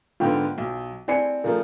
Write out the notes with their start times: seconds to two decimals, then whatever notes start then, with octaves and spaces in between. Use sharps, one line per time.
0.20 G#2 D3 B3 F4 G5
0.58 B1
1.08 C4 E4 D5 G#5 C7 C#7
1.44 C#3 F3 A3 A#4